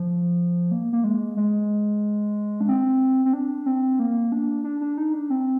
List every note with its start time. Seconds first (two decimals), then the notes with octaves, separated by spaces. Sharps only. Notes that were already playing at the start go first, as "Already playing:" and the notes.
Already playing: F3
0.71 A#3
0.93 A#3
1.04 G#3
1.37 G#3
2.61 D4
2.68 C4
3.25 C4
3.33 D4
3.66 C4
3.99 A#3
4.32 D4
4.64 D4
4.81 D4
4.98 D#4
5.13 D4
5.30 C4